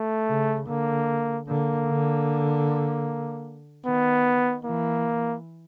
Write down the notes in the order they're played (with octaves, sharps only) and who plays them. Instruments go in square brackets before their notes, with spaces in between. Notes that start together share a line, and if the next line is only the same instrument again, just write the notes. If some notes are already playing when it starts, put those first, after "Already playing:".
Already playing: [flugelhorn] A3
[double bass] C#3
[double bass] D3 [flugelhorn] A#3
[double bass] D3 [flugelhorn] A#3
[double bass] D3
[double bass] D#3 [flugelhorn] B3
[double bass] E3 [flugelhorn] A#3